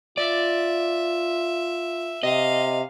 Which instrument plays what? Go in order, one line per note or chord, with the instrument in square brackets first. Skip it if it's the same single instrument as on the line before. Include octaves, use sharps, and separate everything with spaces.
[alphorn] F4 [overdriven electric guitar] D5 [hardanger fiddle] E5
[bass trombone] C3 [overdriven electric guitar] D#5 [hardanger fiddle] F5